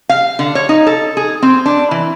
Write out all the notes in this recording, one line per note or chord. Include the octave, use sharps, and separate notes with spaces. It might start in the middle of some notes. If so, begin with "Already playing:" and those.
F5
D3
C#5
D#4
A4
G#4
C4
D4
E3